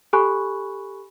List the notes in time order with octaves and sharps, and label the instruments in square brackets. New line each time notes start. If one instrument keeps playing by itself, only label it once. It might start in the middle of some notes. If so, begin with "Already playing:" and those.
[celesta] G4 A4 G#5 B5 C#6 F#6